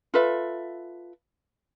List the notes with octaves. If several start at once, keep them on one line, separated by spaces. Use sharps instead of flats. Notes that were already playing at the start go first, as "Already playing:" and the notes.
F4 A4 B4 E5